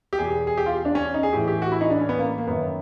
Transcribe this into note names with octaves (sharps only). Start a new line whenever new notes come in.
G4
E2 B2 G#4
G#4
G4
F4
D4
C#4
D#4
G#4
A2 E3 G4
G4
F#4
E4
D#4
D4
C#4
B3
A#3
A#3
F#2 D#3 B3